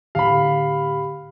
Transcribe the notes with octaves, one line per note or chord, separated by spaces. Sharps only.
A2 D3 G4 F5 B5